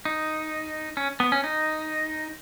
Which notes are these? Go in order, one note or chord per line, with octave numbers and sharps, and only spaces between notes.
D#4
C#4
B3
C#4
D#4